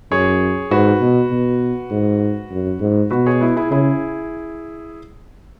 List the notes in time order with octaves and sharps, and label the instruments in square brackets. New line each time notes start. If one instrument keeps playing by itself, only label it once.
[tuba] F#2 [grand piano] G#4 C#5
[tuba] G#2 [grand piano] F#4 B4
[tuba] B2
B2
G#2
F#2
G#2
[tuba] B2 [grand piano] F#4 B4
[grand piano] G#4 C#5
B3 E4
E4 G#4
[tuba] C#3 [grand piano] E4 G#4